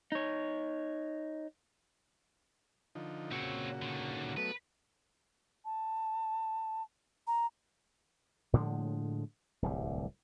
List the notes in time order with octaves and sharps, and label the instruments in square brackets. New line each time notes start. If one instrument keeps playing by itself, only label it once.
[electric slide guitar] D#4 C#5
[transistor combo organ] D3 F3 D#4
[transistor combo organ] A#2 C#3 F#4 [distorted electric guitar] C4 C#5
[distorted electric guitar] D3 D#3
[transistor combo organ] F#3 A3 B3 [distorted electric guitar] B4
[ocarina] A5
A#5
[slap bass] A2 D3 F3 G#3
D1 C2 G3